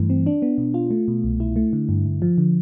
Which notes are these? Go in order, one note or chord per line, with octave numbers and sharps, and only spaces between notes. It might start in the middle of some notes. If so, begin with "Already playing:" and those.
Already playing: G2 E3 A3
C4
D4
B3
B2
F4
A3
B2
C2
E4
A3
D3
G2
G2
F3
D3